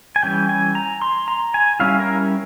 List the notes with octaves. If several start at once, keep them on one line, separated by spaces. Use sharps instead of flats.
G#5
E3 G3 C#4 G5
G#5
A#5
C6
A#5
G#5
G3 C#4 E4 F5
A#4